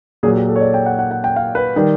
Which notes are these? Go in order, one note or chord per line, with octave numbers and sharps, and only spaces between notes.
A#2 F#3 G#4
G4
A4
C#5
D5
G5
F#5
F#5
F#5
G5
F5
B4
D#3 G3